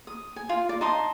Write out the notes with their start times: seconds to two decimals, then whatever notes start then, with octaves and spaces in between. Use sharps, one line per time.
0.07 D#6
0.36 G#5
0.49 F4
0.69 D5
0.81 D#4 A5 C6 D#6